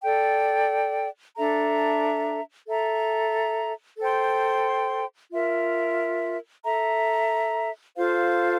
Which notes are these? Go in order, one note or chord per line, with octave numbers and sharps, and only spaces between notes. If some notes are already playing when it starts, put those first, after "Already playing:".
A4 D5 G5
D4 A4 E5 A#5
A4 E5 A#5
A4 C5 G5 C6
F4 A#4 E5
A4 E5 A#5
F4 A4 C5 F5